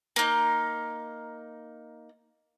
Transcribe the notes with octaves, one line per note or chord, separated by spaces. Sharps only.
A#3 D#4